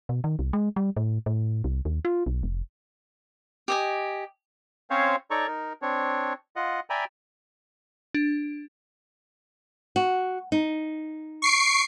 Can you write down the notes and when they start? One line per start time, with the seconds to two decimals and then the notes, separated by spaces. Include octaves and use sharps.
0.09 B2
0.24 D#3
0.39 C2
0.53 G#3
0.76 G3
0.97 A2
1.26 A2
1.64 C2
1.85 D#2
2.05 F4
2.26 B1
2.43 F1
3.68 G4 D#5 G#5
4.90 C4 C#4 C5 C#5 F5
5.31 D#4 A4 C#5 D5 A#5 C#6
5.47 D#4 A#4
5.82 C4 D4 C#5
6.56 F4 D#5 F#5
6.90 D5 E5 G5 G#5 A#5 B5
8.14 D4
9.96 F#4
10.52 D#4
11.42 C#6 C7 D7